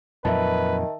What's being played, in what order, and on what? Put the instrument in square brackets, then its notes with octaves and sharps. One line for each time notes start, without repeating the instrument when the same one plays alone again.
[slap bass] F2 A#2 F#3 [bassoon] D#3 [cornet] B4 [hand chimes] E5 A5